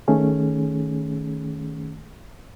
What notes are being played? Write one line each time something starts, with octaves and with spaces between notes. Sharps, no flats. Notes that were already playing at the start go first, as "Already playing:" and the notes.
D#3 A3 C#4 G#4